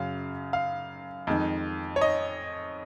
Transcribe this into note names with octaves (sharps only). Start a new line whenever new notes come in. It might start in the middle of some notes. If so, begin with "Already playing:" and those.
Already playing: F#2 C#3 F#3 F5
F5
F2 D#3 G#3
C#5
D#5